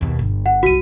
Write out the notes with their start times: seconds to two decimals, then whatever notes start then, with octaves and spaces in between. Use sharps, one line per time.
0.01 D#2 B2
0.19 G1
0.46 F#5
0.63 C2 F#2 F#4 D#7